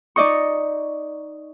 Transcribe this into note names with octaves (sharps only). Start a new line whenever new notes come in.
D#4 D5 D#5 C#6